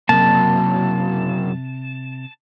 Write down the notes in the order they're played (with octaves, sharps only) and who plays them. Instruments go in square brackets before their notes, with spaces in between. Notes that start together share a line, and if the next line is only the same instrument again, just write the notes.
[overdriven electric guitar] F#2 A#3 [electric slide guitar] C3 [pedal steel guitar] A5